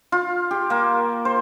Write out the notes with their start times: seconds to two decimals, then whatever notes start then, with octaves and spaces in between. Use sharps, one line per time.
0.12 F4
0.51 G4
0.70 A#3
1.25 C5